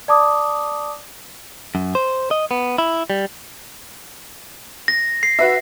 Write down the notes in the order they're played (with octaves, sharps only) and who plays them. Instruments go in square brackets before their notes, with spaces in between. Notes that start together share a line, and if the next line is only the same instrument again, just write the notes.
[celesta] D5 A5 D6 D#6
[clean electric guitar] F#2
C5
D#5
B3
E4
G3
[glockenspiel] A#6
C7
[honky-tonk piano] F#4 B4 E5